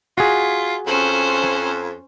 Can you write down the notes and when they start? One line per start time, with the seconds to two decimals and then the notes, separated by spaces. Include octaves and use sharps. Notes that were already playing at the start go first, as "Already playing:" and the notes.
0.18 F4 F#4 G#4
0.86 F2 C#4 C5